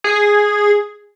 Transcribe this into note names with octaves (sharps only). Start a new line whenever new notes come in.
G#4